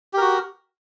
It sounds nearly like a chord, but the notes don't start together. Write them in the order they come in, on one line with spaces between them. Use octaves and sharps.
G4 A#4 F#4